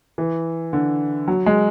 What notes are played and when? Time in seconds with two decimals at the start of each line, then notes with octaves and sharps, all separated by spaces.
0.18 E3
0.73 D3
1.28 F#3
1.46 G#3